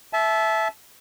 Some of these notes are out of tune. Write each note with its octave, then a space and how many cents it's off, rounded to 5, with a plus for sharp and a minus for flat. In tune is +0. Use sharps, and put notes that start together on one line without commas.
E5 +0 A5 -30